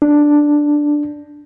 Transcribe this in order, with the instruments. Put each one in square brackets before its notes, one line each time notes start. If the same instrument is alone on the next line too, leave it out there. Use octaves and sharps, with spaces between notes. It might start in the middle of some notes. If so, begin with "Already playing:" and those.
[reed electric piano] D4